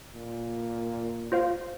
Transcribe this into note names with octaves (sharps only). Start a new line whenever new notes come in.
A#2
F4 C5 F5